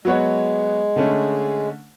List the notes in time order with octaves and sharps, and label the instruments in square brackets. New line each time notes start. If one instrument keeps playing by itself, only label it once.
[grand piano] F#3 B3 F#4 C#5 [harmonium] G#3
[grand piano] D3 A3 C#4